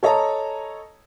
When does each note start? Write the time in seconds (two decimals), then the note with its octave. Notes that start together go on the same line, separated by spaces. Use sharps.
0.03 A4 C#5 D#5 A5 A#5